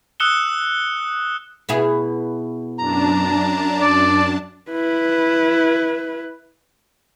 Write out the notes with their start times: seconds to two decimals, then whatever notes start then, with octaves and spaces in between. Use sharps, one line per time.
0.20 D#6 E6 F#6 C#7 E7 G7
1.69 B2 E4 G#4
2.79 F#2 D4 A5 A#5
3.81 D5
4.71 E4 B4